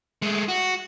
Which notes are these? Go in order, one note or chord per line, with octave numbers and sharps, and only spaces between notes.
G#3 A3
F#4